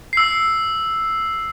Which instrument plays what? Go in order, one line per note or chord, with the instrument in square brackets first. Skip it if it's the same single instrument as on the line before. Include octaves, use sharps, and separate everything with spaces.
[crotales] E6 C7